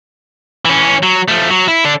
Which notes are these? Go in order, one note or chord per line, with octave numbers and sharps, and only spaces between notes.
E3 C#4
F#3
F3 A3
F#3
E4
D3 D4